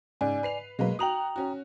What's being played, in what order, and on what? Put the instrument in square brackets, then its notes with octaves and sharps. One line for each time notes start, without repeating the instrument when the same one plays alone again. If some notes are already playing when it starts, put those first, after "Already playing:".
[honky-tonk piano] G#2 C#3 [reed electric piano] D5 G#5
[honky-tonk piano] B4 C7 F7
[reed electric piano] B2 F#3 [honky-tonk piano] G#3 A#3 B4
[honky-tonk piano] F#4 F7 F#7 [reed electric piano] G5 A#5 D#6
[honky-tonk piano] C#4 F#4